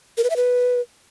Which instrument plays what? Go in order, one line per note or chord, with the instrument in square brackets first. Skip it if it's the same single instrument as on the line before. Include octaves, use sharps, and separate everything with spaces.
[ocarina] A#4
B4
E5
B4